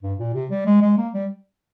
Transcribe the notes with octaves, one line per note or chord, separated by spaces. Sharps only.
G2
A#2
C3
G3
G#3
G#3
A#3
G3